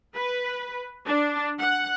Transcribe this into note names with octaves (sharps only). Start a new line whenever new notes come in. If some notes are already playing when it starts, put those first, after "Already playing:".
B4
D4
F#5